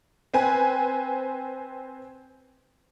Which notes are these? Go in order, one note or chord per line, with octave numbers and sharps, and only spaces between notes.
C4 B4 G#5